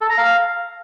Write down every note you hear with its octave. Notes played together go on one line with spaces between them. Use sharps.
A4
A#5
F5